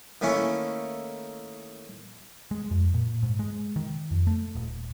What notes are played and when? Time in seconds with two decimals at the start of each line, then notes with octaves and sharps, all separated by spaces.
0.21 D#3 A3 A#3 C#4 E4
2.51 G#3
2.71 F2
2.94 A#2
3.23 G#2
3.39 G#3
3.76 D#3
4.11 F2
4.27 A3
4.55 D#1